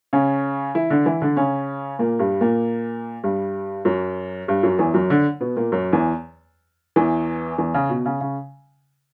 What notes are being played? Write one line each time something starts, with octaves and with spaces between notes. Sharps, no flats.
C#3 C#4
E3 E4
D3 D4
E3 E4
D3 D4
C#3 C#4
A#2 A#3
G2 G3
A#2 A#3
G2 G3
F#2 F#3
G2 G3
F#2 F#3
E2 E3
F#2 F#3
D3 D4
B2 B3
A#2 A#3
F#2 F#3
E2 E3
E2 E3
E2 E3
C#3
B2
C#3
C#3